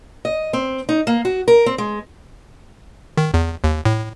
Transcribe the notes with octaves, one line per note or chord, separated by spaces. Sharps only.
D#5
C4
D#4
A#3
F#4
A#4
C4
G#3
D#3
E2
D#2
A2